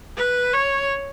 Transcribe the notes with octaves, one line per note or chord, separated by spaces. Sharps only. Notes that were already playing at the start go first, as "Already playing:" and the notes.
B4
C#5